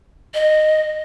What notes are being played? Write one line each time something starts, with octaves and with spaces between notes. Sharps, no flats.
D#5